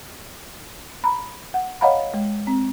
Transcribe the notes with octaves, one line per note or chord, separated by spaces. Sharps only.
A#5 B5
F#5
C#5 D#5 F5 F#5 A#5 B5
G#3
C4